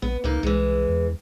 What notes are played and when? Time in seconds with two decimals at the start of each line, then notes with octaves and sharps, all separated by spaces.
0.02 A#1 B3
0.24 C#2 C3 A#3 D#4
0.43 C2 E3 G#3
0.89 E2